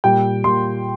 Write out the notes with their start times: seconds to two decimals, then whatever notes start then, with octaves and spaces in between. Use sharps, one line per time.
0.04 A#2 G3 G5
0.44 A#2 G3 C6